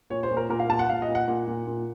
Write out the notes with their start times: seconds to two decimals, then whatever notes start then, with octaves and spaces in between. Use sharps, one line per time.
0.10 A#2 C#5
0.23 C5
0.31 A#2
0.37 A#4
0.49 A#2 A#4
0.60 F5
0.69 A#2 A5
0.79 F#5
0.89 A#2 F5
1.02 D#5
1.08 A#2
1.15 F#5
1.28 A#2 F#5
1.48 A#2
1.67 A#2